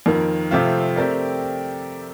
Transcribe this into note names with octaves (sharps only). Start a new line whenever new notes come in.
F2 D#3 A#3
C3 F3 A3 C4 F4
A3 C4 G4 A#4 D5